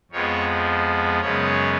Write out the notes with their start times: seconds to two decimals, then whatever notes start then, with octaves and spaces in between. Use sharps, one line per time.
0.11 F2 F3 G#3 B3 C#5
1.20 F#2 C#3 G#3 B3 C#5